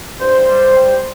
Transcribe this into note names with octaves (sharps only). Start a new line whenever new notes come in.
G2 C5
G3
G3